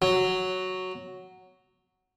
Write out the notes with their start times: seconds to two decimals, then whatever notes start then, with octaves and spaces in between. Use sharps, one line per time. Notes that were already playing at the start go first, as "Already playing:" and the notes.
0.02 F#3